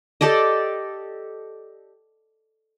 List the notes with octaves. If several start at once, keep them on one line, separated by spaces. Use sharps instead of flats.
G4 A4 D5 D#5